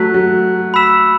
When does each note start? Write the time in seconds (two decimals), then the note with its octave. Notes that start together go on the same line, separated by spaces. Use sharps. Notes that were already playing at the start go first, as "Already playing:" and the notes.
Already playing: F#3 A3 F#6 B6
0.14 F#3
0.74 B5 E6 B6 E7